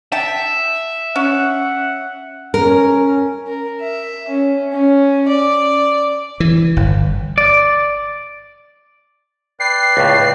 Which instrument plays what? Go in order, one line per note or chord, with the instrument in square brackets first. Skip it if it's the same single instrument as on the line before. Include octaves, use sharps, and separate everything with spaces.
[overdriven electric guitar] E5 [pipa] F#5 G5 A5
[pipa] C#4 [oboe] F#5
[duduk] C#4 [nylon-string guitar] A#4
[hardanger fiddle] A#4
E5
C#4
C#4
D5
[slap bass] E3
G1
[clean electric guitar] D5
[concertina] B4 D5 G5 [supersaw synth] C7
[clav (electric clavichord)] C#2 A2